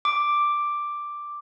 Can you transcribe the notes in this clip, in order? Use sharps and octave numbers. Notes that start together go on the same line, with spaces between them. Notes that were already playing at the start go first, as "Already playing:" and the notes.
D6